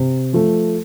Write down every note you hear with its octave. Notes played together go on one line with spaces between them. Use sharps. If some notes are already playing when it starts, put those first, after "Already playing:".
Already playing: C3
F3 A3